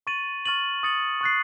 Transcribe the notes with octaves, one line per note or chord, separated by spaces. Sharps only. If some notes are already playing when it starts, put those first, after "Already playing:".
C#6 A6 D#7 F#7
C#6 F6 A6 D#7 F#7
D#6 A6 C#7 F#7
C#6 F#6 A6 C7